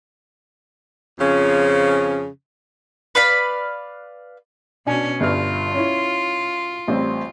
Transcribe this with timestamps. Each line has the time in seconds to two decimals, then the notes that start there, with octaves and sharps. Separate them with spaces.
1.19 F2 C#3 F3 C#4
3.15 B4 D5 F5 B5
4.87 B2 C#4 D4 G#5
5.20 G1 G2 F4 F6
5.74 C#4 E4
6.88 A1 G3 C4